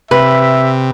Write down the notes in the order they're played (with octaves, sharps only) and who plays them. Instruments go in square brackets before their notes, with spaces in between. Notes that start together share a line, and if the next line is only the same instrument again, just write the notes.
[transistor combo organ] C3 [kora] B4 [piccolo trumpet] E5